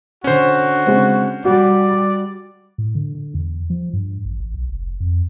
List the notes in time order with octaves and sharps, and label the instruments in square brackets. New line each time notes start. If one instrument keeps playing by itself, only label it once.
[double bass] D3 [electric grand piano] C#4 C5 [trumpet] F#4
[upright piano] C#3 G#3 C4
[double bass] G3 [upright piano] F#4 [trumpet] D5
[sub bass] A2
D3
D3
E2
F3
G2
A1
A1
B1
F1
F2